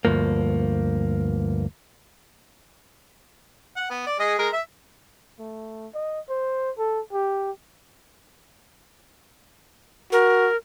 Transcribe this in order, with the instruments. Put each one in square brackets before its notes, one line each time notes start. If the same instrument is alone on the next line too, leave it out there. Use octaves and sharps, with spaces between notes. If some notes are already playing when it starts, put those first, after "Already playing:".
[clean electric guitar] D2 G2 F3 A#3
[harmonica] F#5
B3
D5
G#3 G#4 D#5
G#3 A#4
E5
[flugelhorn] A3
D#5
C5
A4
G4
[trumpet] F#4 [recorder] A#4